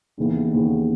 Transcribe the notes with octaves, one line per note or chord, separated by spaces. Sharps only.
D#2 C#3 E3 B3
D#2 C#3 E3 B3